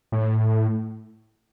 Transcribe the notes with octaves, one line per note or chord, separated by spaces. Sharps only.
A2